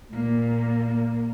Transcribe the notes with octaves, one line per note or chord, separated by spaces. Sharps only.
A#2 A#3